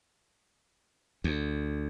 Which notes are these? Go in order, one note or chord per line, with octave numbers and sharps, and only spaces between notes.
D2